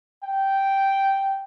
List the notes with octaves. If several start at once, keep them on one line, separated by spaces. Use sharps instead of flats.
G5